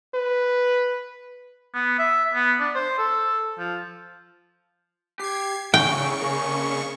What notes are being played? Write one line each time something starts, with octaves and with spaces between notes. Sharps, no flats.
B4
B3
E5
B3
D4
C5
A4
F3
G4 G#6 C7
C#3 E4 G#4 G5 C#6
A#3 G#4